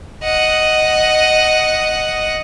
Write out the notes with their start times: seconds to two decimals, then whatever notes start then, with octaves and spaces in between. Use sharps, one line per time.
0.23 D#5 F#5